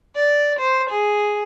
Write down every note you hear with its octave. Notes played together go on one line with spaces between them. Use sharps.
D5
C5
G#4